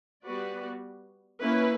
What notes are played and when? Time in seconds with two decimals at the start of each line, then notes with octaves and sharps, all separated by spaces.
0.24 G3 B3 F#4 B4 D5
1.40 A#3 C#4 E4 B4